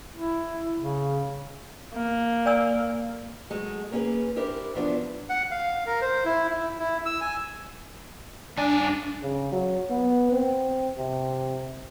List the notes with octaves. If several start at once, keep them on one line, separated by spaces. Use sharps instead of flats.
E4
C#3
A#3
D5 G#5 E6
F#3 G#3 A3
A#3 C#4 F4 G#4 B4
D4 E4 G4 A#4 C5
F3 F#3 B3 D4 E4 F4
F#5
F5
A#4
C5
E4
E4
E4
E6
G#5
G2 D4 G#5
C#3
F#3
B3
C4
C3